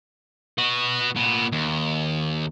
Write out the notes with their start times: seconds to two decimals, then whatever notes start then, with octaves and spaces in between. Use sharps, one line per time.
0.58 B3 F#4
1.16 A#2 B3
1.52 D#2